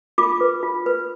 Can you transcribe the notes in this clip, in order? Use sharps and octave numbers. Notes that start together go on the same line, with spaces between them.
F4 D6
B4
F4
B4